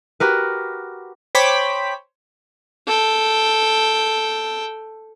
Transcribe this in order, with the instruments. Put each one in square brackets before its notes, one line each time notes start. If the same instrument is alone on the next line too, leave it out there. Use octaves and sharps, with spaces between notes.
[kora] F#4 G4 A#4 B4
[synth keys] C5 C#5 G5 B5 D6 B6
[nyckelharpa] A4 G5